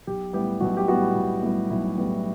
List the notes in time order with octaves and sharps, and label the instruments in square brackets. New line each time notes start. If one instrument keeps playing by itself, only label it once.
[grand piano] B1 G4
A2 G3 B3 G4
B1 F#4
G4
A2 G3 B3 F#4
B1
A2 G3 B3
B1 E4
A2 G3 B3